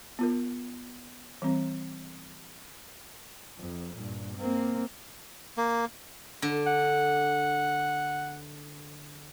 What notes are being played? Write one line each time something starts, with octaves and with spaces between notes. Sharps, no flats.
B3 F4 A#4
E3 G3 C4
F2
G2 A#2
A#3 C4
A#3
D3
F#5